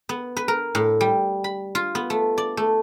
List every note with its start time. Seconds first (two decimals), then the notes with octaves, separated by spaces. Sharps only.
0.09 B3
0.37 B4
0.48 A#4
0.75 A2
1.01 G3
1.44 B5
1.75 F4
1.95 B3
2.10 A3
2.38 D5
2.57 A3